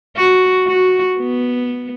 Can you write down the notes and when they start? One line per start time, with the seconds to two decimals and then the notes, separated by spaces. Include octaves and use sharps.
0.16 F#4
0.68 F#4
1.19 B3